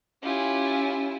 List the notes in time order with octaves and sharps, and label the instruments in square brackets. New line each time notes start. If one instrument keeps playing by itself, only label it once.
[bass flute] C#4 [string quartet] E4 F4 [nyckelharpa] G4 G#5